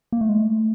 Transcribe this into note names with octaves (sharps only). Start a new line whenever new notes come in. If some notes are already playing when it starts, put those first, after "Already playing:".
A#3
A3
G#3
A3